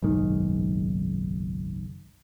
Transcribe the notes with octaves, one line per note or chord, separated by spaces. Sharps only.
F#1 B1 G#2 D#3